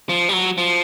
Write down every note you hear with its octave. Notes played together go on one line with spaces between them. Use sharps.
F3
G3
F#3
F3